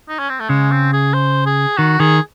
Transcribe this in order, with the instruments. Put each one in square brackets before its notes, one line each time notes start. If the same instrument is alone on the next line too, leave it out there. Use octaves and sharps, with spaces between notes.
[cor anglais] D#4
C#4
C4
A3
[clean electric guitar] C#3 [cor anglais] G#3
[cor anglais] C4
G#4
C5
G#4
[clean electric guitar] D#3 [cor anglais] F#4
[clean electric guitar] D#3 [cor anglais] G#4